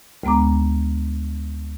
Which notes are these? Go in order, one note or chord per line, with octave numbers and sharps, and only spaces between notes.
D2 G#3 B3 A#5 D6